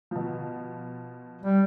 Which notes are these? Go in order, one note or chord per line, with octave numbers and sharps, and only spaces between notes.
B2 F3
G3